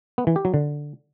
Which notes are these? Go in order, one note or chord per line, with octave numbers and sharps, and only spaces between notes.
B3
E3
G4
F#3
D3